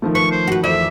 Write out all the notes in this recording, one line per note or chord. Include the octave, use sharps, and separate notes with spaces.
D#3 F3 A3
B4 C#6
C5
F#4 B4
F2 E3 D5 E5